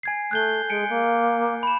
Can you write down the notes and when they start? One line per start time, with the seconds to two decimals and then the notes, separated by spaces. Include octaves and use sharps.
0.03 G#5 G#6 C7
0.31 A3 F#6 G6 G7
0.69 G#3 G#5 C#7 D7
0.89 A#3
1.63 B5 E7